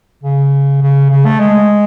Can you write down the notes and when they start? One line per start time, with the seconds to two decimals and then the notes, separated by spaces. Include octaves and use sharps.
0.24 C#3
0.82 C#3
1.10 C#3
1.25 A3
1.40 G#3